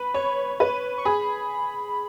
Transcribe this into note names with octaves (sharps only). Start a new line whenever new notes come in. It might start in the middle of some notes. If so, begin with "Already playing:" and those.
Already playing: B4 B5
C#5
B4
C#6
G#4 B5